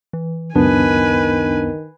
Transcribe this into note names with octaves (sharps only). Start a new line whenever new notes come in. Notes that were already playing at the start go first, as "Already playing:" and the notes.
E3
C#2 F#2 D#3 B3 D4 B4 G#5